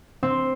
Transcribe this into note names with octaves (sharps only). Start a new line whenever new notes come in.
C4